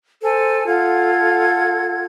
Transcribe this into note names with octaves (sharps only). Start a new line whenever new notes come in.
A4 C5 G#5
F4 A4 F#5 G#6